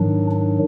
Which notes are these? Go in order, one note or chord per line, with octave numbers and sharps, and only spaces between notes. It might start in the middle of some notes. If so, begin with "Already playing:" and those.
Already playing: G#2 D#3 F#3 D4
D4